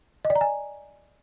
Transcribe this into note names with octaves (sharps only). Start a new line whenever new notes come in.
D#5
D5
A#5
G#5